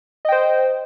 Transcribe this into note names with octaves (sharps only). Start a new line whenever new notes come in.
C5 D#5 G5